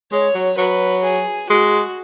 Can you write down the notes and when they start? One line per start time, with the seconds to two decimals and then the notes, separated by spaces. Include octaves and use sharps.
0.11 G#3 C#5
0.34 F#3
0.57 F#3 B4
1.03 G#4
1.50 G#3 F#4